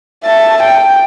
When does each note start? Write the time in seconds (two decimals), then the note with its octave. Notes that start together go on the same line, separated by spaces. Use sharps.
0.24 E5 A5
0.63 G5